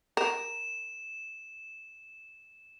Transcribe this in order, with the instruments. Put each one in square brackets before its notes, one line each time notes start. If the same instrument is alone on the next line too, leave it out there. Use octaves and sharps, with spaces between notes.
[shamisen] A#4 [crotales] E7